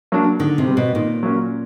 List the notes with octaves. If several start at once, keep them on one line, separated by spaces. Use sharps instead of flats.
F#3 A#3 D4
D3 D#3
C3
G3 C4
B2
A#2 D#3
F#3 A#3 C#4